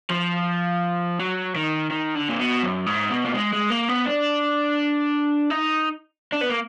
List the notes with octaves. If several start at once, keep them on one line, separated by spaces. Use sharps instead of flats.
F3
F#3
D#3
D#3
D3
A#2
B2
F#2
G#2
B2
A#3
G#3
G#3
A#3
B3
D4
D#4
D4
B3
A#3